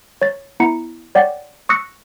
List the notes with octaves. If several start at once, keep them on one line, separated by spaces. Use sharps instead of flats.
C#5 A6
B3 E4 A#5 C#7
C#5 D5 F#5 G5 A6
C#6 D#6 E6 F#6 A#6 C#7